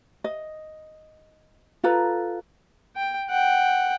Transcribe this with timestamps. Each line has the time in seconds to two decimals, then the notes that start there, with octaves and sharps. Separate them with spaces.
0.24 D#5
1.84 F4 A4 B4 A#5
2.96 G5
3.30 F#5 G5